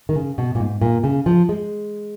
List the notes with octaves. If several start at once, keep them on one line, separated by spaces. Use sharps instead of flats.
D#3
C#3
B2
A#2
G#2
A#2
C#3
F3
G#3